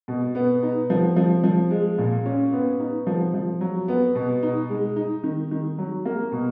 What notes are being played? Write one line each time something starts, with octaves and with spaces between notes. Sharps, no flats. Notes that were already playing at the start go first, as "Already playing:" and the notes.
B2
B3
D#4
F3
F3
F3
G#3
A#2
C#4
B3
D#4
F3
F3
F#3
B3
B2
D#4
G#3
D#4
D#3
D#3
F#3
A#3
B2